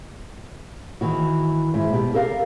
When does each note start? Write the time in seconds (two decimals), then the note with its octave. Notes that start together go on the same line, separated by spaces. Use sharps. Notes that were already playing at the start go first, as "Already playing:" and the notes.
1.01 D#3 E3 F#4
1.74 G#2 E4
1.93 B2 G4
2.14 G4 A4 A#4 F5